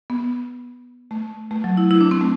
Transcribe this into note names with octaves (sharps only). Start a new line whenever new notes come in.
B3
A3
A3
F#3
E4
E4
D4
C4
A3